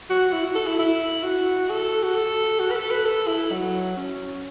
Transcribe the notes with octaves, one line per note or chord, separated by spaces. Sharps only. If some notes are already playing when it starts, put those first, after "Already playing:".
F#4
E4
F#4
A4
E4
E4
F#4
A4
F#4
A4
F#4
B4
A4
B4
A4
E4
F#3
C#4